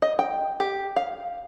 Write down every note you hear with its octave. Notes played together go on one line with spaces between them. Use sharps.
D#5
G5
G4
F5